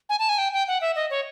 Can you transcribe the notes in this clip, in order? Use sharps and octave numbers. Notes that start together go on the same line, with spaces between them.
G#5
A5
G#5
G5
G5
F#5
E5
D#5
C#5